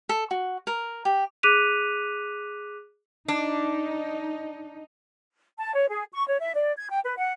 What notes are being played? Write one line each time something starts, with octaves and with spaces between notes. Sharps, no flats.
A4
F#4
A#4
G4
G#4 D6 F#6 B6 D#7 F7
D4 D#4
A5
C#5
G#4
C#6
C#5
E5
D5
G#6
G5
B4
F#5